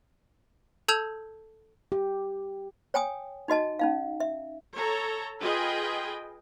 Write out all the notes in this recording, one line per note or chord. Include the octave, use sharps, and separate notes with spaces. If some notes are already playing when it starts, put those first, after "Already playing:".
A4 A5 E6 G6 G#6 F7
G4
C#5 G5 G#5 D#6
D#4 F#4 D#5 A5
C#4 D#4 F5
E5
A4 C#5 A#5
F4 G#4 B4 D#5 G5